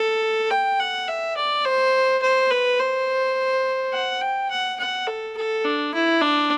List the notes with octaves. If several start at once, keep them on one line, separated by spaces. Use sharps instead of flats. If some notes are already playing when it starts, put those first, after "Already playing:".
Already playing: A4
G5
F#5
E5
D5
C5
C5
B4
C5
F#5
G5
F#5
F#5
A4
A4
D4
E4
D4